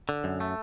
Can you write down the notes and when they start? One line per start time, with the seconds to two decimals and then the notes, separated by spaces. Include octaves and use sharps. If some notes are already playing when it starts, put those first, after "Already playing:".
0.09 D3
0.24 F#2
0.40 A3